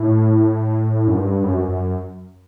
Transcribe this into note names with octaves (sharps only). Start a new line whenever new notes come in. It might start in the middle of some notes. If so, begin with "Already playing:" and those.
Already playing: A2
F#2
G2
F#2
F#2